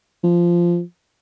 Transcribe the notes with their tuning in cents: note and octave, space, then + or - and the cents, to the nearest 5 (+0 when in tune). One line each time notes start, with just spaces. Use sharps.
F3 -10